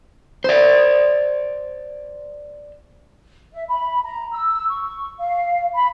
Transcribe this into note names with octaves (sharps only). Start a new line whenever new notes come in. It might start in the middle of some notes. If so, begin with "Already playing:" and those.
C5 D5
E5
B5
A#5
E6
C#6
F5
B5